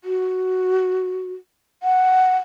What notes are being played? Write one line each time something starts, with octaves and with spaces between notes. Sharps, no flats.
F#4
F#5